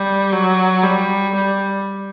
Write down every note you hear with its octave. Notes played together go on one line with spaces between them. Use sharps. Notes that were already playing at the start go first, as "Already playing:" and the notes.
Already playing: G3
F#3
G3
G3